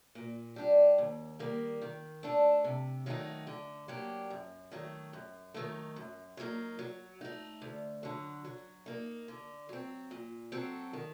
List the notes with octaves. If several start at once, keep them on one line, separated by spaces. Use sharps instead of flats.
A#2
G3 D4 G4
D#2
D#3 G3 A#3
D#3
A3 D4 A4
C3
D#3 F#3 A3 D#4
D3
F#3 A#3 D4 G4
F#2
D#3 F#3 A3
F#2
D#3 F#3 A3 D#4
F#2
F#3 A#3 D#4
F#3
A3 D#4
D2
D3 F#3
F#3
A#3 D#4
D3
F#3 C4
A#2
F#3 C4 F#4 A4
D#3